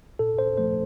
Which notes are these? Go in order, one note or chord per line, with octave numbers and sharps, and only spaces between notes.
A#2 A4
C5
F3 A3 C5